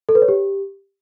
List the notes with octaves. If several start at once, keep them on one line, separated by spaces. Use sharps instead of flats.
A4
B4
C#5
G4